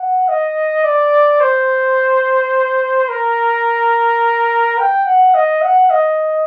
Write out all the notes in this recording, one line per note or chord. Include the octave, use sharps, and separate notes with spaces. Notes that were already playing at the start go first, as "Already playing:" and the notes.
Already playing: F#5
D#5
D5
C5
A#4
G5
F#5
D#5
F#5
D#5